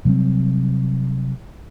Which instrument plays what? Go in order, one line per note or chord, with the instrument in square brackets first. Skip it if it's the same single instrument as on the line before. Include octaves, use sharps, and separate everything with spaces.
[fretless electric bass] C3 F#3 G3 C4